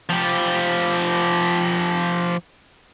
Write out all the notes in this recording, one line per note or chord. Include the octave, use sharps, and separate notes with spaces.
F3 G4